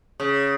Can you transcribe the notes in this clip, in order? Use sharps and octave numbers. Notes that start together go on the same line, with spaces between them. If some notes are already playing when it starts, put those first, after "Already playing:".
C#3